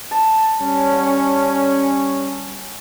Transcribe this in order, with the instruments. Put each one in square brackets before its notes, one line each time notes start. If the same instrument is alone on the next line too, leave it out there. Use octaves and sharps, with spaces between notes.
[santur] A5
[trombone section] G3 C#4
[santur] F#5